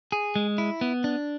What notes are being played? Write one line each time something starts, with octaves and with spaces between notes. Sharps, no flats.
G#4
G#3
E4
B3
D4